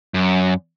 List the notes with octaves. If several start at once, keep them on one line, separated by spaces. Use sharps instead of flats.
F#2